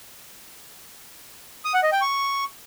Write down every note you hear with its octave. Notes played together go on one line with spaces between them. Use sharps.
D#6
F#5
D#5
G5
C#6